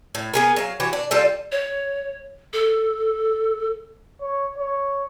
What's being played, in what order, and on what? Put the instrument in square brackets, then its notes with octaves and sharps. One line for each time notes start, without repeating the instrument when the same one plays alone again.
[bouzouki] A2
B3 G#4 A#4
F#3 F5
E3 F#4 G4
D4
G3 F4 A4
[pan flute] C#5
A4
[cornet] C#5
C#5